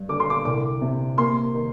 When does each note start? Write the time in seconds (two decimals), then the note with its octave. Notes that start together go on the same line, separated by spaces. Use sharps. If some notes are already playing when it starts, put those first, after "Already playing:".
Already playing: G2
0.09 D3 D6
0.20 C6
0.30 D6
0.45 C2 D6
0.81 C3
1.18 A#3 C6
1.54 D#3